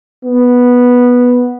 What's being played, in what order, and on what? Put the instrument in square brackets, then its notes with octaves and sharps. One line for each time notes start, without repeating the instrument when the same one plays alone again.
[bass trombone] B3